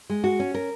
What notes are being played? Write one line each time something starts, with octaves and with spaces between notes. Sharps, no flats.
G#3
F#4
C#4
A#4